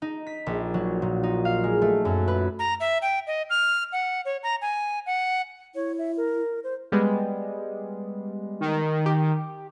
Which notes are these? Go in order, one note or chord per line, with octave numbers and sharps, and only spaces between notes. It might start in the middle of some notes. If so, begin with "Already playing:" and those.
D#4
B6
A#1
F#3
A#2
D#4
F5
G#3
A3
F#2
B4
A#5
E5
G5
D#5
F6
F#5
C#5
A#5
G#5
F#5
E4 C#5
E5
A#4
C5
G3 G#3 B3
D#3
G4